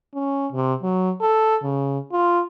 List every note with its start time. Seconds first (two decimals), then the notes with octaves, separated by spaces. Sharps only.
0.14 C#4
0.52 C3
0.82 F#3
1.21 A4
1.63 C#3
2.12 F4